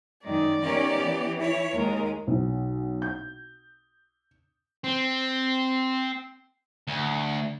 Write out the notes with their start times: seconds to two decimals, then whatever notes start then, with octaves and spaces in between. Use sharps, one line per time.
0.24 F#2 D#3 G#3 D5
0.63 D#3 B3 C#4 G4 A#4
1.00 E3
1.38 E4 C#5
1.75 D#2 G#3 A#4
2.27 B1
3.02 G6
4.84 C4
6.88 D2